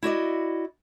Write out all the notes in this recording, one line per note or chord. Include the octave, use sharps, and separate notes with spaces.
E4 F#4 D5 D#5